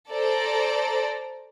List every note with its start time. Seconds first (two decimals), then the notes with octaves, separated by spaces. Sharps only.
0.10 A4 C5 D5 A#5